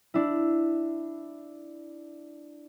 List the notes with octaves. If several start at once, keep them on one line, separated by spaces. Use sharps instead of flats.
D4 E4